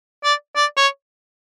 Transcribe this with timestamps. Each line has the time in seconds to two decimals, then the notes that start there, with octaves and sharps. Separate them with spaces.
0.24 D5
0.56 D5
0.77 C#5